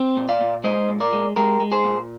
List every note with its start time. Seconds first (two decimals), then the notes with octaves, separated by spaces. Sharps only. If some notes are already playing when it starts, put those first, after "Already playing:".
Already playing: C4
0.17 A#2
0.29 D5 F5
0.41 A#2
0.64 G#3 C5 D#5
0.89 A#2
1.00 A#4 D5
1.13 G#3
1.36 G#3 G4 A#4
1.60 G#3
1.72 G#4 C5
1.84 A#2